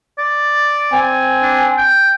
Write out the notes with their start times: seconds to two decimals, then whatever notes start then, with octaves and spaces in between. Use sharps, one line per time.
0.19 D5
0.92 C4 G#5
1.43 D4
1.78 G5